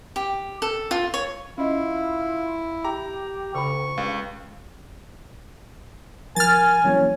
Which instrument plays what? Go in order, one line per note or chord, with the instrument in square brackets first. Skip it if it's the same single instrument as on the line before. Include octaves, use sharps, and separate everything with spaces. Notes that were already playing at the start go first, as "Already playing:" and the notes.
[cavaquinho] G4
A4
F4
C#5
[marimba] C#4 D#5 [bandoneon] E4 [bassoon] F4
[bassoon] G4 [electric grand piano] A#5
[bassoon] D2 [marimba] C#3 B5 [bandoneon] C#6
[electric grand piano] C#2 [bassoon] G2 [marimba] F5
[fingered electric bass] F3 [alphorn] A#4 [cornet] G#5 [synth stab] F6 A6
[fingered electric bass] E3 F#3 A#3 [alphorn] C#4